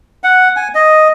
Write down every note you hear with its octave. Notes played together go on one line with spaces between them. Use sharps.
F#5
G#5
D#5